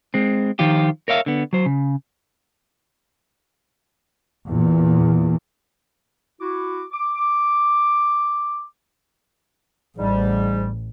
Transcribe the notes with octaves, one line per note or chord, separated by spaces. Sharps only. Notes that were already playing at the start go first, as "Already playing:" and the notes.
G#3 C4
D#3 F3 F4 G4
A#4 C#5 E5 F5
D3 B3
F#3 C5
C#3
E2 A#2
E4 F#4 D6
D6
A1 G#2 G3